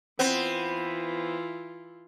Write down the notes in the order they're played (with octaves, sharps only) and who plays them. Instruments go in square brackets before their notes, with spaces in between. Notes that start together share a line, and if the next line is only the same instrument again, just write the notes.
[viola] E3 F4 [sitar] B3 C4